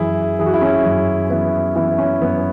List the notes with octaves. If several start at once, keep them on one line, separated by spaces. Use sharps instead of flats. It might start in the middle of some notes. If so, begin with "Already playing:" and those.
Already playing: F#2 E3 E4 G#4
E3 G#4
F#4
E4
C#4 F#4
F#2
E3 B3 E4
E3 B3 E4
C#4
F#2 B3